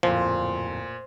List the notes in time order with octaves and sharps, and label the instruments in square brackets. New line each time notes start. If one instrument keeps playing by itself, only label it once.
[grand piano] D1 F2 [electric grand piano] A#2 [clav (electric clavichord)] F3 [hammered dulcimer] C5